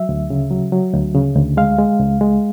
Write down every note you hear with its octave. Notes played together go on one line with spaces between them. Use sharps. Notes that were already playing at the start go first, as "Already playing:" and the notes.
Already playing: F#3 E5
D2
C#3
F#3
F#3
D2
C#3
D2
G#3 F5
G#3
C#2
G#3